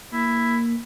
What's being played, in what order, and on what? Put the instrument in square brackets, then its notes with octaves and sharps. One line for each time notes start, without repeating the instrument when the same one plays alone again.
[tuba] A#3 [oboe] E4